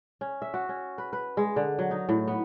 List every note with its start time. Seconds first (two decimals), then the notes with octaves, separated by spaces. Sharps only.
0.21 C#4
0.42 E5
0.54 F#4
0.69 C#4
0.98 B4
1.13 B4
1.37 G#3
1.56 D3
1.79 F#3
1.91 D#4
2.09 A2
2.27 B3